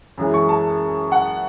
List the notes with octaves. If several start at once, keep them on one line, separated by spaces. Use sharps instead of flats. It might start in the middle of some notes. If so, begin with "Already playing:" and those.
F#2 E3 G#3 C#4 E4
C#6
A5
F#5